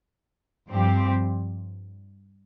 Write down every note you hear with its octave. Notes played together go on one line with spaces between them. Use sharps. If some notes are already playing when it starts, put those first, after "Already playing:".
G2 F3 C4 G4